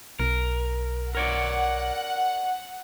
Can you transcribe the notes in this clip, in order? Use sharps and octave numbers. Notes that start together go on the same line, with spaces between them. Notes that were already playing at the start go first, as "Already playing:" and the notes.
B1 A#4
A#4 C#5 D5 F#5